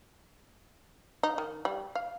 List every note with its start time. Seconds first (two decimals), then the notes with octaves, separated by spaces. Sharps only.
1.23 D#4
1.38 D#3
1.65 G3
1.95 F5